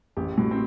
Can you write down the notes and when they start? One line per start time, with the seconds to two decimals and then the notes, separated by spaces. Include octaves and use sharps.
0.17 A1 G4
0.38 A2 F#4
0.51 C4